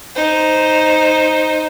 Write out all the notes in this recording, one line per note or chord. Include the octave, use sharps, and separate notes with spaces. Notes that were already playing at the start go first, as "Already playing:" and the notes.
D#4 C5